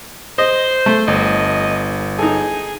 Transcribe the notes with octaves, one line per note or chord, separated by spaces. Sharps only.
C5 D#5
A3
G1 D#5
D#4 G#4 A4